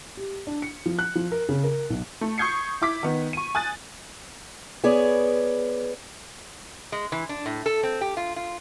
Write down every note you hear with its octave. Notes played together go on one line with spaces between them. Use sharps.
G4
D4
C#7
F3
F#6
F3
A#4
C#3
A#4
B1
A3
C#6 D#6 G6 G#6 C7 C#7
E4 D6 B6
D#3 B3
C#6 D#7
G#5 D#6 F#6 A6
B3 G#4 C#5 D5
G#3
E3
D4
A2
A4
C4
G4
F4
F4